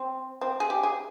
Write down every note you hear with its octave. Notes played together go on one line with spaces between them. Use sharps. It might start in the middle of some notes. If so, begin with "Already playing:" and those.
Already playing: C4
C4
G#4
G4
G#4